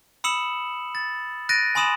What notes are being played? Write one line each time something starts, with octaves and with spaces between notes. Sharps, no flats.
B5 D#6 E6 C#7 E7 F#7
A6
F#6 A6 A#6 D7 D#7
G#5 B5 C6 D#6 E7 F#7